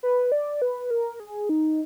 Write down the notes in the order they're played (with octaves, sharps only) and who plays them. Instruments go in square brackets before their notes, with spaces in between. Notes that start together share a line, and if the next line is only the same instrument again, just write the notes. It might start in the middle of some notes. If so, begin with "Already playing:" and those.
[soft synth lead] B4
D5
B4
A#4
G#4
D#4